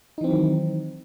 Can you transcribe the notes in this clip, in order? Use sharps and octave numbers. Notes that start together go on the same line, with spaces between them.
D#3 E3 F#3 C4 D#4